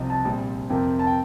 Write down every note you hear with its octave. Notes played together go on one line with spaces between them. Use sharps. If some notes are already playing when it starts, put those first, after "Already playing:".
Already playing: C2 C3 F3 C4 D#5
A5
A#1 A#2 G3 C4
F2 C3 F3 A#3 G5
A5
G5